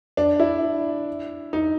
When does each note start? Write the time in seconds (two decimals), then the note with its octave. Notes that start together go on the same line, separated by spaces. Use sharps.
0.17 D4
0.40 E4
1.53 D#4